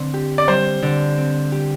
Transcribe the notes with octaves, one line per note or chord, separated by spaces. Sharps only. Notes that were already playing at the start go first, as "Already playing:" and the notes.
Already playing: D3 C4
G4
D5
G3 C5
D3
C4
G4